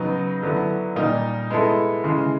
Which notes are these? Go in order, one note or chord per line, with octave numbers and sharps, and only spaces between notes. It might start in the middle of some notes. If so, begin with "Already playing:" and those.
Already playing: C#3 F#3 B3 D#4
D3 F#3 B3 E4
A#2 G3 A#3 D#4
G#3 B3 E4 A4
C#3 E3 G#3